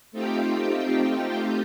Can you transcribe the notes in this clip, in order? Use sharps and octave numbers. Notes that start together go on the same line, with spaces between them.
A3 C4 D#4 F4 G4 G5